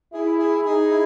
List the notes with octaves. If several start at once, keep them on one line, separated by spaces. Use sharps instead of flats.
E4 G#4
G#4
D#4 G#4
E4